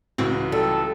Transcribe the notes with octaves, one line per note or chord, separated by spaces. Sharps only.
C#2 A2 E3 C4 F#4
G3 A4